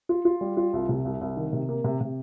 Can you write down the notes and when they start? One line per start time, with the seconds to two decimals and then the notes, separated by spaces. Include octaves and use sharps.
0.09 F4
0.25 F4
0.41 G3
0.57 F4
0.73 C2
0.89 C3
1.05 C2
1.21 C2
1.37 D#3
1.53 C3
1.69 A#3
1.84 C3
2.01 C3